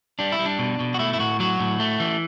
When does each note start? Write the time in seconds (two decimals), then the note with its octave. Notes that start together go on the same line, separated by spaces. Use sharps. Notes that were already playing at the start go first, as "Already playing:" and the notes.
0.19 G3 D4
0.32 E4
0.39 G3
0.46 D4
0.59 B2
0.80 B2
0.94 F#4
0.99 A3 E4
1.14 E4
1.19 A2 F#4
1.40 F#3 F#4
1.60 A2
1.80 A3
2.00 E3